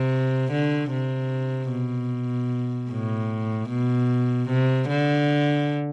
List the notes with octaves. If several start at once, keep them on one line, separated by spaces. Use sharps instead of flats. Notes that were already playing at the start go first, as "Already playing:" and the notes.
Already playing: C3
D3
C3
B2
A2
B2
C3
D3